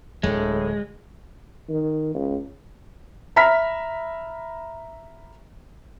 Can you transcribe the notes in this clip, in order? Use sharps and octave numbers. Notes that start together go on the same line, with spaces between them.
D1 D2 A2 D3 G#3
D#3
C#2
E5 A#5 B5 F6 B6